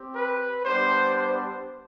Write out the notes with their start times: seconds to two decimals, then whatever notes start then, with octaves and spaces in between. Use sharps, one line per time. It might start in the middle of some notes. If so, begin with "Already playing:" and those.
Already playing: C4 G4
0.15 B4
0.65 G3 B3 D4 G4 C5
1.14 C5